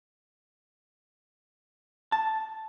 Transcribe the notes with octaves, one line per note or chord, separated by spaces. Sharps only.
A5